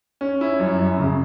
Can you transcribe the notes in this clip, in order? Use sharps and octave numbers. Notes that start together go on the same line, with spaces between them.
C#4
E4
F#2
F#2
C#3